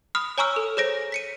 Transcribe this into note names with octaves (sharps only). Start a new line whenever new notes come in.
B5 D#6 F6
C#5 G#5 A#5 C#6 E6 F6
A4
G#4 C5 C#5 A#6 D7
B6 C#7 D#7